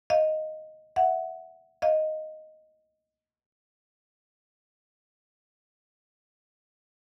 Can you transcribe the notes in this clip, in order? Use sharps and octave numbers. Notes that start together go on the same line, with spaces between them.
D#5 F5
E5 F#5
D#5 F5